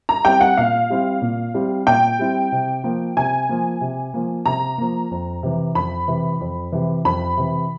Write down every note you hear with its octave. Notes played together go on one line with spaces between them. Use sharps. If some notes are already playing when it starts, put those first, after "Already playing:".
A#5
G3 C4 E4 G5
F#5
A#2 F5
G3 C4 E4
A#2
G3 C4 E4
A#2 G5
G3 C4 E4
C3
F3 A#3
C3 G#5
F3 A#3
C3
F3 A#3
C3 A#5
F3 A#3
F2
C3 E3
F2 B5
C3 E3
F2
C3 E3
F2 B5
C3 E3